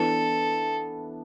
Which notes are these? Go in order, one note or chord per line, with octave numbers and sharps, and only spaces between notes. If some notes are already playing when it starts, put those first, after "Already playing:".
Already playing: E3 B3 D4 A4